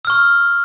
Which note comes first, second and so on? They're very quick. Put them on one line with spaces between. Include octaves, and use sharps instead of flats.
E6 F6 C#6